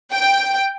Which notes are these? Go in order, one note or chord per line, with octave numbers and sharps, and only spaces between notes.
G5